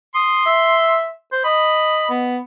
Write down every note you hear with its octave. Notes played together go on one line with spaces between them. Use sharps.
C6 D#6
E5
C5
D#5 B5
B3